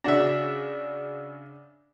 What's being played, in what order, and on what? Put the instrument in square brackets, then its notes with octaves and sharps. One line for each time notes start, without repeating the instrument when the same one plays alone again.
[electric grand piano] C#3 F#4 A#6 [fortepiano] D4 E5